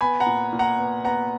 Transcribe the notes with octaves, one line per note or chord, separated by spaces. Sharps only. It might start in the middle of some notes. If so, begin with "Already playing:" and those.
B3 G#5 B5
F#5 A#5
A#2
A#2
F#5 A#5
B3
B3 F#5 A#5